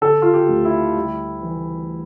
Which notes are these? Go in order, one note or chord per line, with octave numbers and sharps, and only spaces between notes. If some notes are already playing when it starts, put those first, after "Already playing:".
D3 A4
F4
G4
D2
E4
G3
E3